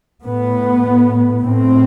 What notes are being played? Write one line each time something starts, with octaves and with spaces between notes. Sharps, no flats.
A2 B3
A2 C4